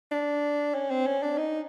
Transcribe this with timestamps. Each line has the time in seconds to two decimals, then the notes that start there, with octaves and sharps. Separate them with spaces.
0.12 D4
0.74 C#4
0.90 C4
1.06 C#4
1.23 D4
1.38 D#4